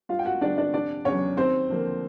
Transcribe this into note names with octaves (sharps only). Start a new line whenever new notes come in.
G2 F4 F5
G5
F#4 F#5
D3 G3 B3 D4 D5
D4 D5
F1 D4 D5
E2 C#3 F#3 C#4 C#5
D#2 C4 C5
D3 F3 A#3